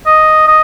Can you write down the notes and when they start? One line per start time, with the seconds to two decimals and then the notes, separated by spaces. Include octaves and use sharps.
0.06 D#5
0.47 D#5